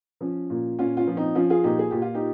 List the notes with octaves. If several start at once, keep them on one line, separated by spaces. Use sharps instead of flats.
F3 C#4
A#2
A#2 C#4 F4
C#4 F4
F3
C4 D#4
F3 C#4 F4
F4 G#4
A#2 D#4 G4
G#4
A#2 G4
F4
D#4 G4